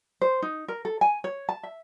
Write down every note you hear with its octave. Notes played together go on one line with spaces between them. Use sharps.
C5
D#4
A#4
A4
G#5
C#5
A5
E5